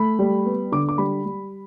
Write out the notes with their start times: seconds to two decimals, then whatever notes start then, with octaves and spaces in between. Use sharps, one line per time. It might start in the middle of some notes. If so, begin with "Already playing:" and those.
Already playing: A3 B5
0.19 G3
0.46 B3
0.72 D3 D6
0.89 D6
0.98 G3 B5
1.26 G3